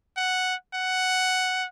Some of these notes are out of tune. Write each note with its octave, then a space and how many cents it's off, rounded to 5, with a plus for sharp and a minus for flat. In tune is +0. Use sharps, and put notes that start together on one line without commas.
F#5 +0
F#5 +5